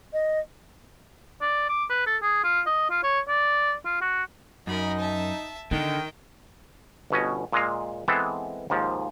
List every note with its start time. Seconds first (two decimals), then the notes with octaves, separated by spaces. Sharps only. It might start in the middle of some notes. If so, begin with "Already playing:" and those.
0.13 D#5
1.41 D5
1.69 D6
1.90 B4
2.07 A4
2.22 G#4
2.44 F4
2.66 D#5
2.90 F4
3.03 C#5
3.28 D5
3.85 F4
4.01 F#4
4.67 F#2 D#4 A#4 B5
4.99 E5 A5
5.71 D3 D#3 D4 D#4 G5
7.10 G1 B2 C#4 D#5
7.53 A#2 G#3 D#5 F5
8.08 E3 G#3 B3 C4 A4
8.70 D#2 G#2 F3